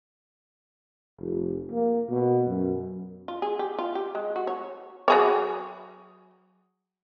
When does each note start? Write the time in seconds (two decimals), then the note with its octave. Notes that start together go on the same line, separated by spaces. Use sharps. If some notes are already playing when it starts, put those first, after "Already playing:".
1.19 F1
1.71 A#3
2.09 B2
2.47 F#2
3.28 F4
3.42 G#4
3.59 G4
3.79 F4
3.95 G4
4.15 G#3
4.36 F#4
4.47 C#5
5.08 F#3 G#4 C#5